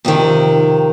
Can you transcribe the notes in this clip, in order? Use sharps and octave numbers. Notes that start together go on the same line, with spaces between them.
F2 C3 D#3